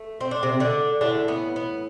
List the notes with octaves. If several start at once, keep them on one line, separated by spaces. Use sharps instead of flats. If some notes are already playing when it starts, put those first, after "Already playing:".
Already playing: A3
C4
D4
C3 C4
D3 D4
A2 D3 E3 A3 D4
B3
B3